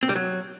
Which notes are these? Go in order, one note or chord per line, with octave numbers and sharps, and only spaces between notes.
C4
G3
F#3